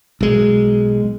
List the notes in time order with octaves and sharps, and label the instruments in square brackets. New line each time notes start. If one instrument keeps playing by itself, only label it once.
[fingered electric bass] B1 G#3